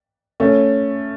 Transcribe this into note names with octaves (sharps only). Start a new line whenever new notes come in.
A3 C#4